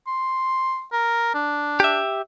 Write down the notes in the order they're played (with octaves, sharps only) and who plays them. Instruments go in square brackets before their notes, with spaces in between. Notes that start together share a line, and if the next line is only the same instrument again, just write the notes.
[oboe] C6
A#4
D4
[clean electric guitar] G4 E5